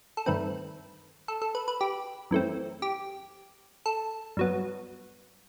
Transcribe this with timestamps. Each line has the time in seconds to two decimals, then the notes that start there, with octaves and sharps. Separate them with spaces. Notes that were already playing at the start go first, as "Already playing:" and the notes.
0.17 A4
0.26 G2 D#3 A3 C4 B4
1.28 A4
1.42 A4
1.55 B4
1.68 B4
1.81 G4
2.31 F#2 E3 A3 C4
2.82 G4
3.86 A4
4.37 G2 F#3 B3